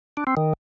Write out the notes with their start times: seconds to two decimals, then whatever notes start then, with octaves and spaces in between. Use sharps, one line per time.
0.17 D4
0.27 C4
0.37 D#3